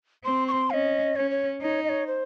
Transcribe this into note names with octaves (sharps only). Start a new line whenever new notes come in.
C4 C6
C#6
C6
C#4 D#5 F5
C#4 C#5
C#5
D#4 C#5
D#5
C#5
C5